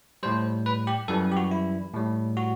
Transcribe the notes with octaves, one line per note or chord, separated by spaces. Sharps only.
A2 G3 C5
B4
G4
F#2 E3 G3 A4
G4
F#4
E4
A2 G3
F#4